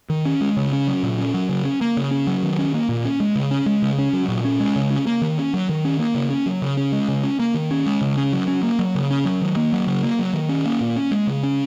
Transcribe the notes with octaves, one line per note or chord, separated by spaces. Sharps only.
D#3
C#4
G#3
C#3
C#4
F#3
A#2
C#4
F#3
C#3
C#4
A#3
C#3
C#4
F#3
D#3
C#4
A#3
A#2
C#4
G#3
C#3
C#4
G#3
C#3
C#4
F#3
A#2
C#4
G#3
C#3
C#4
A#3
D#3
C#4
F#3
D#3
C#4
A#3
C#3
C#4
F#3
C#3
C#4
G#3
C#3
C#4
A#3
D#3
C#4
G#3
C#3
C#4
F#3
C#4
A#3
F#3
C#3
C#4
F#3
D#3
A#3
F#3
C#3
A#3
F#3
D#3
C#4
A#3
A#2
C#4
G#3
C#3
C#4